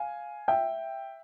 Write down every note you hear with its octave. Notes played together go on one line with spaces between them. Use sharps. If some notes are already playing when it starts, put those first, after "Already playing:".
Already playing: F5 G#5
E5 G5